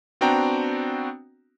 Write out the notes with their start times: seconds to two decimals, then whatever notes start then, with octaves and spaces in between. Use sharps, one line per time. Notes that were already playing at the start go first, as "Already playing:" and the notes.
0.21 B3 C4 D4 F#4 G5 A#5